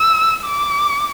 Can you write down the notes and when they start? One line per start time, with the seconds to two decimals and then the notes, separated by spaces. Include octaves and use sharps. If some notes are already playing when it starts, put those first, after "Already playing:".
Already playing: E6
0.45 D6